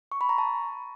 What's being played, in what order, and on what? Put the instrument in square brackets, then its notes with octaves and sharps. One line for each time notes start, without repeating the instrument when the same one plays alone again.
[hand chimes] C#6
B5
A#5
A5